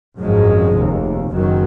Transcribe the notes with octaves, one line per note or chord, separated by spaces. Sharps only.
G#1 F#2 F3 G#3
F1 D#2
F#1 F#2 D#3 F#3